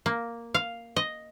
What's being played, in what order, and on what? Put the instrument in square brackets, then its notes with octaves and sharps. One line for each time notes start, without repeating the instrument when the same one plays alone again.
[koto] A#3
F5
D#5